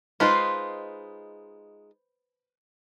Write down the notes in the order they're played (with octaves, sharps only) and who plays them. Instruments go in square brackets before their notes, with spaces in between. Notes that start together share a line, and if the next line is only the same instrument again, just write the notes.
[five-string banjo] G#3 D#4 F4 [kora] B4 C5